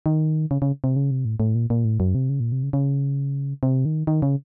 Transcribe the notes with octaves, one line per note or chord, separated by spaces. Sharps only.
D#3
C#3
C#3
C3
C#3
C3
A2
A2
A#2
A#2
A2
F#2
C3
C#3
A#2
C3
C#3
C#3
C3
D#3
D#3
C#3